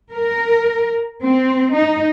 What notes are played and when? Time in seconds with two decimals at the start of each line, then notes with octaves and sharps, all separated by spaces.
0.13 A#4
1.24 C4
1.76 D#4